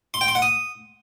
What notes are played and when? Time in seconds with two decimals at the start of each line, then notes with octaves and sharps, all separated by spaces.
0.14 C6
0.21 G5
0.28 C6
0.35 F#5
0.42 D#6